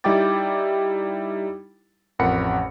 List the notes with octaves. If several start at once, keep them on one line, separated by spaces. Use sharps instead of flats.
G3 D#4 E4 G5 D6 A6
A1 F2 A#4 F#5 B5 C#7